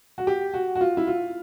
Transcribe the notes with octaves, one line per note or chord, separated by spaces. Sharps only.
F#4
G4
F#4
F#4
F4
E4
F4